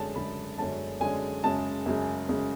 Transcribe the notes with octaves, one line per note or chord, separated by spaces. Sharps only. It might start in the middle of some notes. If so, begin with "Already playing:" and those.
Already playing: F#2 D3 G#3 C#4 A5
F#2 D3 G#3 C#4 B5
F#2 D3 G#3 C#4 A5
F#2 D3 G#3 C#4 G#5
F#2 C#3 G#3 A5
F#2 C#3 G#3
F#2 C#3 G#3